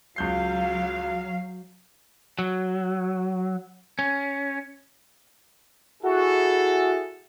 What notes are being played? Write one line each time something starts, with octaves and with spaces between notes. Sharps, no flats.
C#2 F#3 F5 G6 C7
F#3
C#4
E4 F#4 G#4 A4